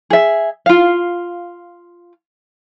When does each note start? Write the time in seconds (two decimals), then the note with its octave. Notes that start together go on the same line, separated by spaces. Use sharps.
0.10 G#4 E5
0.66 F4 F5